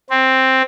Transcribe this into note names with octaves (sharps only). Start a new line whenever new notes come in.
C4